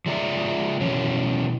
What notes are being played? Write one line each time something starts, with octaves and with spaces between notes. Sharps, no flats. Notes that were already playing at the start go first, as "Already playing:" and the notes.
F3 G#3 D5 E5 G#5 A#5
B2 E3 F#3 C#4